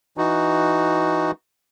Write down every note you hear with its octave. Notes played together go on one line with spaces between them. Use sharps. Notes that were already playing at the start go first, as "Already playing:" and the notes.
E3 D#4 F#4